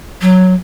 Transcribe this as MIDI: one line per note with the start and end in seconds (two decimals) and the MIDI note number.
0.21 0.53 54